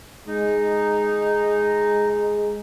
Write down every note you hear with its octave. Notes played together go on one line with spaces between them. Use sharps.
G#3 D#4